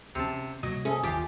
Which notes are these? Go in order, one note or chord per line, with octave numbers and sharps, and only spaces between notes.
D2 C3 C#4 A5
C3 F#3 A#3 D#5
C#4 G#4 A4 E5
G1 D#2 E3 F4 G4 G#5 D6